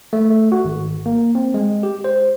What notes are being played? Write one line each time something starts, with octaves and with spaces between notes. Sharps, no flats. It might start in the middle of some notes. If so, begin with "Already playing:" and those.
A3
A3
F#4
G#1
A#3
C4
G#3
G4
C5